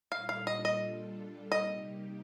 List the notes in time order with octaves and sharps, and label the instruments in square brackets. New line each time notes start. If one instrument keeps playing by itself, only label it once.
[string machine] A#2 G3 D4 F4 A4 [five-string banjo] F5
[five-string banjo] F5
D#5
D#5
[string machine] C3 G3 A#3 D#4 G4 [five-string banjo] D#5